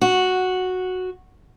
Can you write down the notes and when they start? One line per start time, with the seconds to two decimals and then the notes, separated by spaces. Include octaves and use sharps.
0.01 F#4